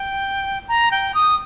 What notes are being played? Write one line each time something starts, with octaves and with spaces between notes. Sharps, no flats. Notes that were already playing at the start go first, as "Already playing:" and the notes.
Already playing: G5
A#5
G5
D#6